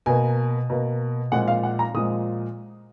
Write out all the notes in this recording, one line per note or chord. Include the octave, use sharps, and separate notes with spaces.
B2 A#3 G#5
B2 A#3
A#2 F3 G#3 F#5
F5
F#5
A#5
A#2 F3 G#3 D#6